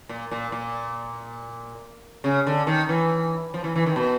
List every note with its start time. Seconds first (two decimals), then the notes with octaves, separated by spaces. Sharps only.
0.09 A#2
0.31 A#2
0.52 A#2
2.24 C#3
2.47 D3
2.67 D#3
2.89 E3
3.54 F3
3.64 E3
3.76 E3
3.86 D#3
3.96 B2